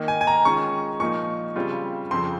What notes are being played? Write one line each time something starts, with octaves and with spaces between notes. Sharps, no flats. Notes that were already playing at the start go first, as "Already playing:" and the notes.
Already playing: D#3 A#3 D#4
G#5
G#5
A#5
D#3 G#3 C#4 F4 C#6
A#2 F3 A#3 D#4 C#6
C#3 G3 C4 F4
F2 C#3 F3 C4 C6